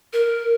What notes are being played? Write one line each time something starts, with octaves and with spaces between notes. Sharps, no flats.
A#4